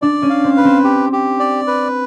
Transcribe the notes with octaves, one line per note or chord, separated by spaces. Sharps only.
D4 D5
C#4
F5
C4
B4
C4
G4
G4
D5
B4